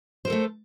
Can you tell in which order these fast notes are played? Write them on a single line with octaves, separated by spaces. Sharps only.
C5 A#4 A4 A3